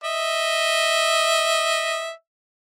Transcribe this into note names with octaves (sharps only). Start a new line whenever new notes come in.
D#5 E5